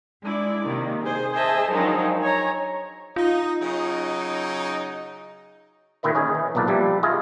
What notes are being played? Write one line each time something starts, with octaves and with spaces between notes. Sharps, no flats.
G#3 D4 E4 D5
C3 D#3 A#3
G#4 C5
G#4 C5 D#5 E5 G#5 A5
D#3 F3 F#3 G#3 D4 D#4
C#5 G#5 A#5
D#4 F4
C#3 F#3 D#4
A#2 D#3 E4 B4 D#5
C#4 D#4 G#4
E3
B1 A#2 A#3 B4 A5
F3 G3 E4
E4 F4 G#4 D#5